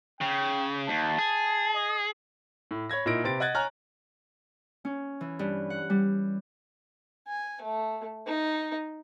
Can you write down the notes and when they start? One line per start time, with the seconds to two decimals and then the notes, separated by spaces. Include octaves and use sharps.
0.21 C#3 G5
0.88 D#2 A5
1.19 G#4
1.75 D#5
2.71 A2
2.90 C#5 B5 G#6 A#6
3.06 A#2 D#4 E4 A#6 D7
3.24 C3 G4 B4 C6 A6 D7
3.40 D#5 F#5 F#6 G#6 A6
3.55 C#5 G#5 A#5 F6 F#6
4.85 C#4
5.21 E3
5.39 G2
5.70 F#5
5.90 G3
7.28 G#5
7.62 A3
8.27 D#4